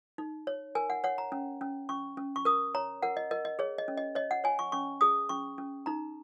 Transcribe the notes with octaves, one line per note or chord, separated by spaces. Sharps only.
D#4
C#5
A#4 G#5
F#5
C#5 F#5
A#5
C#4
C#4
C#4 C#6
C#4
C#6
A#4 D#6
C#5 A#5
A#4 F#5
D#5
A#4 D#5
D#5
G#4 C#5
D#5
C#4
D#5
C#5 D#5
F#5
C#5 G#5
C#6
C#4 C#6
G#4 D#6
C#4 C#6
C#4
D#4 A#5